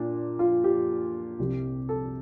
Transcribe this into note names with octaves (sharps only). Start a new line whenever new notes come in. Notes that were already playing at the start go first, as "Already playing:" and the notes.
Already playing: A#2 D4
F4
G4
C2 C3 G3
A4